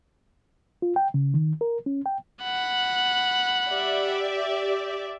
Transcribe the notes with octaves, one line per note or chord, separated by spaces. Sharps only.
F4
G5
C#3
D#3
A#4
C#4
G5
F#5 B5
G4 D5 E5